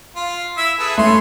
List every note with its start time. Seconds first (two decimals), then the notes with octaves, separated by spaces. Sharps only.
0.16 F4
0.57 E4 E5 E6
0.79 G#4 A4 B4
0.98 A3 C#4 C6